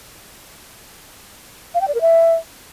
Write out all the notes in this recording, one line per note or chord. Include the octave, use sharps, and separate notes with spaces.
F5
G5
D5
A#4
E5